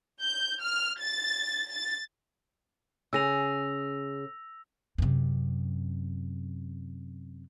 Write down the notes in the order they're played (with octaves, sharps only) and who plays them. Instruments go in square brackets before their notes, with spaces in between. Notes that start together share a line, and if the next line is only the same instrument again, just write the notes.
[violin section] G6
F6
A6
A6
[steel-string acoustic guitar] C#3 G#4 [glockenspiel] E6 A#6 F7
[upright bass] F#2 C3